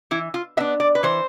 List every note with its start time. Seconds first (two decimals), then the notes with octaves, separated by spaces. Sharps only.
0.11 E3 E4
0.34 F4
0.57 B3 E5
0.60 D4
0.80 D5
0.95 B4
1.03 E3 C5